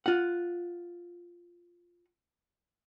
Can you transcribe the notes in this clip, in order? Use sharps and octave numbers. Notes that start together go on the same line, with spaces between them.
F4 F#5